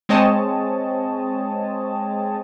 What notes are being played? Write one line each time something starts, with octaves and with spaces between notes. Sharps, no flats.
G#3 C4 C#5 D#5 A5